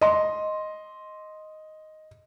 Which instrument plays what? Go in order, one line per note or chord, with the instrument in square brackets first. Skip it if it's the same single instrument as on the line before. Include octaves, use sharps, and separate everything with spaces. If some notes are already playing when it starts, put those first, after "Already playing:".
[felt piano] D#5 C6